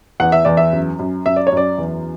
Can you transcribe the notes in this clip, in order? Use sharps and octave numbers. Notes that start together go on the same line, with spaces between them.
E2 F#5
E5
E2 D5
E5
F#2
F#2
F#2 E5
D5
C#5
F#2 D5
E2